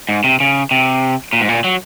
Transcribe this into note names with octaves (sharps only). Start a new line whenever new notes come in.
G#2
C3
C#3
C3
A#2
G#2
A#2
F#3